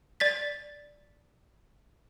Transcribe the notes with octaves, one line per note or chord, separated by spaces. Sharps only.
D5 A6 B6